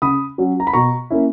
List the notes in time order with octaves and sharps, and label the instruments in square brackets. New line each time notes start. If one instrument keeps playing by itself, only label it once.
[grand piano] C#3 B5 D#6
F#3 C#4
A#5
B5
B2 A#5 C#6
A#3 C#4 E4